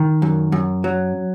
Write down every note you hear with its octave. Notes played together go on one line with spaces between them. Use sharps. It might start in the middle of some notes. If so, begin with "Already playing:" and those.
Already playing: D#3
F#2
F#2
F#3